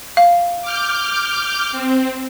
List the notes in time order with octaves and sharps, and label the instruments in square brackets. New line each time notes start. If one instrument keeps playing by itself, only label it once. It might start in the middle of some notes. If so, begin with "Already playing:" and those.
[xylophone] F5
[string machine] D6 F6 G6
C4